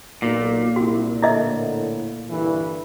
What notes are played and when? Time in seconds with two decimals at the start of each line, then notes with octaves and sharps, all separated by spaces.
0.22 B1 A#2
0.76 C2 F#4
1.22 A2 D3 E4 D#5 E5
2.29 G2 D3 E3